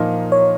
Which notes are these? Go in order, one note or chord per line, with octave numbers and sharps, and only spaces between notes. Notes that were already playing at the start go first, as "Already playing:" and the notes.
Already playing: A#2 F3 A#3 D#4 A#4
C#5